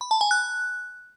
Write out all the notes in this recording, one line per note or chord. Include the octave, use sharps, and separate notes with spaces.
B5
A5
G#5
F#6